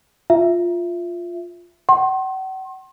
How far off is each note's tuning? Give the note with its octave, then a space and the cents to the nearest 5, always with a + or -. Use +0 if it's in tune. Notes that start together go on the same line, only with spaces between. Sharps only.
F4 +0 E5 +15
F#5 +40 C6 +35